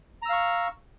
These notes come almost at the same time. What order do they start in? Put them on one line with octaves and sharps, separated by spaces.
A#5 E6 F5 C#6